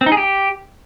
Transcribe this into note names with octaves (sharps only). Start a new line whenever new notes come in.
C4
D#4
G#4
G4